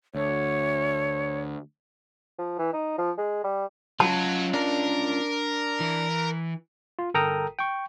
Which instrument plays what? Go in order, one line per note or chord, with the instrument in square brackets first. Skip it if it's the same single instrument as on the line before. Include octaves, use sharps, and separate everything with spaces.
[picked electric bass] D2 [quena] C#5
[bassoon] F3
E3
D#4
F3
G#3
G3
[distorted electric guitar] F#3 [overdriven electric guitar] C#4 F4 [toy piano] A5
[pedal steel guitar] D4 [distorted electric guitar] A#4
[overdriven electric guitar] E3
[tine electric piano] F4
G1 A4 A#4 G5 A#5 D#6
G5 C#6